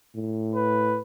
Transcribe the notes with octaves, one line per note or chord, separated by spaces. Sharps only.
A2
B4